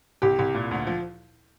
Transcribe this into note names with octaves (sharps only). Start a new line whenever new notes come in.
C2 G4
C2
A#2
D2
F3